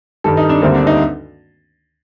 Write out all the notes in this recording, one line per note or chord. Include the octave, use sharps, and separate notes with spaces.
G2 D#3 G3 A4
D#4
D4
D2 D3 G3 A#3 C4
D4
D#4